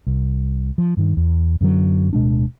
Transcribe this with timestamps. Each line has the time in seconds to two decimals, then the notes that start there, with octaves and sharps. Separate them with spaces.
0.07 C2
0.78 F3
0.97 G2 D#3
1.17 E2
1.61 F#2 D3 F#3
2.13 D1 B2 G#3 D4